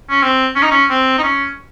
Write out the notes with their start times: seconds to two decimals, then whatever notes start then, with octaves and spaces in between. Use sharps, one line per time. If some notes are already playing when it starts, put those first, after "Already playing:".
0.10 C#4
0.23 C4
0.56 C#4
0.63 D#4
0.71 C#4
0.90 C4
1.18 D#4
1.23 C#4